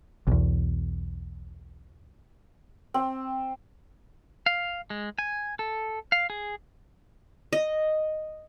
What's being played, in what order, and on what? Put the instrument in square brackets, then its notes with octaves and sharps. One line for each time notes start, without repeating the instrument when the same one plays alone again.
[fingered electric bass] B1 E2
[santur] C4
[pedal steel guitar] F5
G#3
G#5
A4
F5
G#4
[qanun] D#5